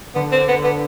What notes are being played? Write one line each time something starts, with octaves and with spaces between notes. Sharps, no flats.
D3 B3
C4
D3
B3
D3 B3